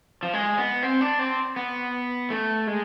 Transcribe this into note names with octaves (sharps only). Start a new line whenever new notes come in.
F3
G#3
B3
C4
D4
C4
B3
A3
G#3